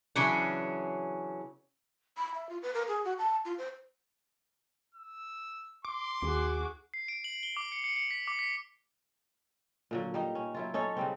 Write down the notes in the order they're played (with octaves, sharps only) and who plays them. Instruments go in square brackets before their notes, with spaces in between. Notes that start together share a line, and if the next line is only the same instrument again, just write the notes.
[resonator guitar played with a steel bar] C#3 E3 F#3 C#4 D4
[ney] B5
E5
F4
B4
A#4
G#4
F#4
A5
F4
C5
[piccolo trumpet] E6
[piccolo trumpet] C6 [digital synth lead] D6
[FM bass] D#2 [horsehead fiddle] F#4 G#4
[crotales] C7
D7
F#7
G7
D6
C#7
C#7
C#7
B6
D6
B6
[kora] A#2 D3 F#3
G3 D#4 G4
C#4
F#3 E4 F4
C#4 D#4 A4 C#5
C#3 G3 C4